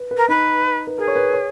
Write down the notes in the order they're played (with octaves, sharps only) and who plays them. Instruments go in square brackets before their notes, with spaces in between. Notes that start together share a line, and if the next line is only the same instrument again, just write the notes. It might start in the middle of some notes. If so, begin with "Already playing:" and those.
Already playing: [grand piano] B4
B4
[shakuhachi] A#4
[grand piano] D#4 [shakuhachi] B4
[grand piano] B4
[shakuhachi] G#4 [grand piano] A#4
[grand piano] C#5
B4
C#5